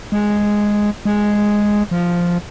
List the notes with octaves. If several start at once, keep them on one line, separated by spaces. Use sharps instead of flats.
G#3
G#3
F3